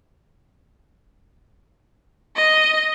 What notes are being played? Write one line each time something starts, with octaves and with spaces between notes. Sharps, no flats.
D#5